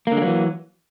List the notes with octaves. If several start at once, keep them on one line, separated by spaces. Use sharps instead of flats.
D3 E3 F#3 G#3 A#3